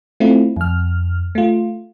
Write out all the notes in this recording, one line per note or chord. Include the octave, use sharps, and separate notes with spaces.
A3 C4 E4 F4
F2 F6
A3 F4